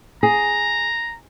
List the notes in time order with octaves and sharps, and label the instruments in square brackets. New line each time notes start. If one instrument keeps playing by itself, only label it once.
[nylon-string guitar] G#4 [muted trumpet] A#5